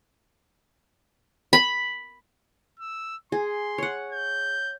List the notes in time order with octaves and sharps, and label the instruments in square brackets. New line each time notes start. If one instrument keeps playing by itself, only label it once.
[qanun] B5
[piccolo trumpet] E6
[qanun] G#4 [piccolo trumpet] C6
[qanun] C#5 F#5
[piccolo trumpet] G6